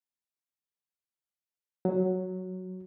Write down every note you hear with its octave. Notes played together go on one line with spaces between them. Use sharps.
F#3